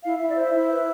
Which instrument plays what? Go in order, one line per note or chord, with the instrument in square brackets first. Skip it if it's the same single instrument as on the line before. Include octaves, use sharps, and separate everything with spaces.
[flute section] E4 F5
E4 E5
D5
C5
E5
E4
B4 E5